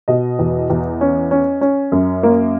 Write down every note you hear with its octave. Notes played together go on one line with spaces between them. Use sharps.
B2 D#5
E2
E2
C#4
C#4
C#4
F#2
A#3